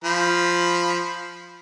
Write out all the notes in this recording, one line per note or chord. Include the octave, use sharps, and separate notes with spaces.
F3 B5